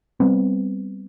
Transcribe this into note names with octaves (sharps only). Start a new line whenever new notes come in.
G3 B3 C4